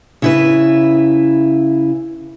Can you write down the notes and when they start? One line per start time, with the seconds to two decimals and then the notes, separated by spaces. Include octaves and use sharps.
0.22 C#3 E4 B4